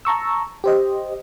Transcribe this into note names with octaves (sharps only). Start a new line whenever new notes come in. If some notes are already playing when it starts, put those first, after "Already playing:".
A5 A#5 C#6 E6
G4 C5 D#5